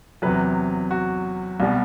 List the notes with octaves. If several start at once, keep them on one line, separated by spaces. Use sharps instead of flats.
E2 C3 F#3 B4
F#4
C2 B2 G3